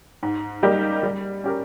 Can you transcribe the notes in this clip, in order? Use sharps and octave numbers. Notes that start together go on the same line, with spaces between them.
G#2
G3 A#3 D#4 G4
G3
C#4 G4 A#4